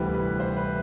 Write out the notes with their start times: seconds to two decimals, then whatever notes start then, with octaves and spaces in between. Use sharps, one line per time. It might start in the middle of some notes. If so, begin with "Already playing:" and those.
Already playing: D2 C3 E3 G3 C4 B4
0.14 B4
0.40 C5
0.57 B4